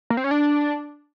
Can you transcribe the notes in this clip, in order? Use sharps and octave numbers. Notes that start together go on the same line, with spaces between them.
A#3
C4
C#4
D4